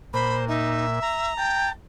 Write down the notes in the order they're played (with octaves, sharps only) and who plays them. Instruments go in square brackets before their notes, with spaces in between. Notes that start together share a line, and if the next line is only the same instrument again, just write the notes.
[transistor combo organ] A#2 [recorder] C5 [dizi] B5
[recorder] D#4 [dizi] E5
[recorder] A#5
[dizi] G5 [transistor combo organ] A5